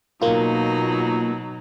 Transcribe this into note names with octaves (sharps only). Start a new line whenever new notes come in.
B2 F#3 A#3 D#4 F4